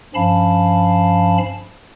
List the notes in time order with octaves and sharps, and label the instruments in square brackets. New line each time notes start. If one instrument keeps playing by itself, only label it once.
[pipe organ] G2 F3 C#4 F5 A5 B5